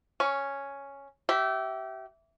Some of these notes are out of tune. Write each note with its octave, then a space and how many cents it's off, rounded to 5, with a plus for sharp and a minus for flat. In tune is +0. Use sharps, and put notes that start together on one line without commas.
C#4 +0 C#6 +20
G4 -30 E5 +0